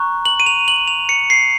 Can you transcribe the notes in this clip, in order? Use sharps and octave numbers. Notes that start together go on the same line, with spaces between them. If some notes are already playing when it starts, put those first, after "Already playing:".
Already playing: A#5 C#6 F#6
F#7
D#7
F7
F#7
F7
C#7
C7